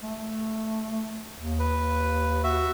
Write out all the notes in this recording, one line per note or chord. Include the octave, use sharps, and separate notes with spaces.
A3
D#2
B4
F#4 E5